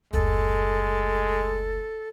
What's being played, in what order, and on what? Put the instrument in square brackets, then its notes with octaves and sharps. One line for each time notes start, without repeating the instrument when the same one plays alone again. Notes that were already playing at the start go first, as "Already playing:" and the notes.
[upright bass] F#1 D2 [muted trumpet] G#3 [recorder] A4